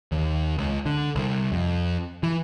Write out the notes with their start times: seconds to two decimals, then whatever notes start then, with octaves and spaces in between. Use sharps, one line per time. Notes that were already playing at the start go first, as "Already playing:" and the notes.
0.12 D#2
0.58 C#2
0.86 D3
1.15 C2
1.52 F2
2.23 E3